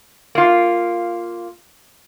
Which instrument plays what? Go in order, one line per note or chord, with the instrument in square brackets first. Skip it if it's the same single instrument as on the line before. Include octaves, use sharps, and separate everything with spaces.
[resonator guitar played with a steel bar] A#3 F4